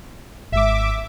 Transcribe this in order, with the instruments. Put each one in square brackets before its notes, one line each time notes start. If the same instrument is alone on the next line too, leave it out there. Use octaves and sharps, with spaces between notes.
[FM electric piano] G#1 G#2 [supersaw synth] E5 D6